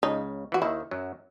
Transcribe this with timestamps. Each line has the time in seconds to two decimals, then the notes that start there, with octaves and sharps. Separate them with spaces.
0.03 C#2 C#3 D#4
0.52 E3 F#4
0.62 D#2 D#3 E4
0.91 F#2 F#3